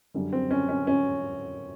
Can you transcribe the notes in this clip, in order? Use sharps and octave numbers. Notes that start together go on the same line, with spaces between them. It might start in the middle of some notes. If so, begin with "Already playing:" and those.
F#2 D3 G3
C4
C#4
C#4
C#4